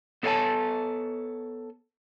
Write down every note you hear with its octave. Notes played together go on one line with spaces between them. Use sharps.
B3 A4 C#5 F5 G#5 A5